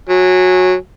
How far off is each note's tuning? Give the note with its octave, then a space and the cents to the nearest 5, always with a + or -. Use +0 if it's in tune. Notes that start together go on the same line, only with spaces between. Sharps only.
F#3 -15 G#5 +0